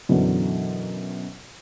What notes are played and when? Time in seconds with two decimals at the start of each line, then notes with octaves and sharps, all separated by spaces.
0.09 F#2 B2 D3 E3 F#3